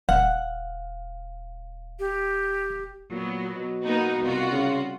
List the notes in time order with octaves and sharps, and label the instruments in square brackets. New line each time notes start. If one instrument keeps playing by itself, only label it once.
[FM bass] D#1 [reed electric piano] F5 [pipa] F#5
[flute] G4
[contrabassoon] A#2 [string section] F#3 B3
[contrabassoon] B2
[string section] A#3 B3 D#4
C2 F4 F#4
[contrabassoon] C#3